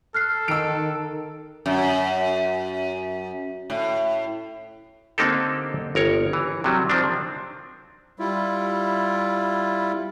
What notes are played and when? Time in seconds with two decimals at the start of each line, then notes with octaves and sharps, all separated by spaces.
0.14 A4 F6 F#6 C7
0.48 D#3 E6 D7
1.66 F#2
3.70 A2
5.18 D3 A#3 C4 D#4 G4 A4
5.95 G1 A#4 C#5
6.33 E3
6.64 C3 F#3 G3
6.90 D#3 F3 C4 D4
8.19 G3 E4 F4